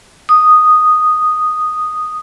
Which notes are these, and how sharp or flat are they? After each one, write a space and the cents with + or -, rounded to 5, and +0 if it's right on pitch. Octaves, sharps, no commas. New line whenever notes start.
D#6 -5